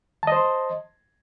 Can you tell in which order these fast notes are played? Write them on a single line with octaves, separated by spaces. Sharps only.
A5 D#5 C5 C6